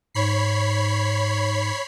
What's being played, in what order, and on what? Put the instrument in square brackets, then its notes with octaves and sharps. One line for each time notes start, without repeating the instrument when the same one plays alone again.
[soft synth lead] G#2 [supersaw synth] C#5 B5 C7